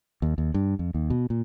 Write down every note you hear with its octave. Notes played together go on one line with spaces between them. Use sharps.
D#2
D#2
G2
F2
D#2
B2
A#2